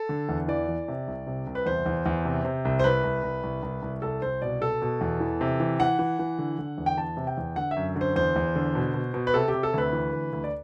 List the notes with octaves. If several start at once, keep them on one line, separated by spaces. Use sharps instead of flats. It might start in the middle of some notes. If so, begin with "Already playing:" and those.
Already playing: A4
D3
E2
E3 D5
E3
C3
C2
C3
C2
B4
E2 C5
E2
E2
C3
C3
C2
C5
C2 B4
C2
C2
C2
C2
C2
C2 A4
C2 C5
B2 D5
B2 A4
B2
E2
E3
C3
E3
E3 F#5
E3
E3
D3
D3
E2
G5
E3 A5
C3
G5
E2
D3 F#5
E5
F#2
D3
C5
E2 C5
E2
D3
B2
B2
B2
B4
C3 A4
G4
C3
A4
D2 B4
E3
D2
D2
D5